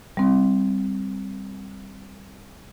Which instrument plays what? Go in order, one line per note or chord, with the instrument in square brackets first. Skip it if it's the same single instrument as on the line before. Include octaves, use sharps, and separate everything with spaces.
[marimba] G3 C4